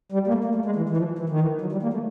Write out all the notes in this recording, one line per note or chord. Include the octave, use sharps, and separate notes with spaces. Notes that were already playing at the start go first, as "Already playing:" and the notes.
G3
A#3
A3
A#3
A3
G#3
E3
E3
F3
E3
D#3
E3
F#3
G3
A#3
A3